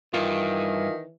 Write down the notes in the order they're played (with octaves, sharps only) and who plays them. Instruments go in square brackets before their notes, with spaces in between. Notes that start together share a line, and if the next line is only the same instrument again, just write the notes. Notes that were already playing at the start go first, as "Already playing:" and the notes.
[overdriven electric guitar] G2 [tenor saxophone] D#3 [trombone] E3 [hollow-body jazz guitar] F4